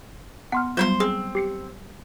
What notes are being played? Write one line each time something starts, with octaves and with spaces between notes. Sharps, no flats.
B3 F#5 C6 F6
F#3 G3 B3 F4 C5 B5 C6 G6
C4 G#4
G4 C7 C#7